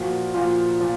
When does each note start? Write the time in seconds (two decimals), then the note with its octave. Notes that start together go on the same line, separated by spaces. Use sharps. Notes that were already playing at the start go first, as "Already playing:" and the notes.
Already playing: A#2 F3 F#4
0.34 A#2 F3 F4
0.81 A#2 F3